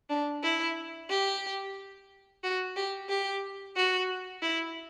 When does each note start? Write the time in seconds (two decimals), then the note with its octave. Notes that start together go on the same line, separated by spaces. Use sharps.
0.10 D4
0.43 E4
1.10 G4
2.43 F#4
2.76 G4
3.09 G4
3.76 F#4
4.42 E4